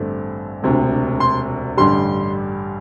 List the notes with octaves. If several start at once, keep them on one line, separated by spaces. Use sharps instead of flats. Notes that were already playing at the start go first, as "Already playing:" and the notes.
Already playing: A1 G2 D3 A3 C4
E1 D2 C3
C6
A1 G2 D3 G3 C6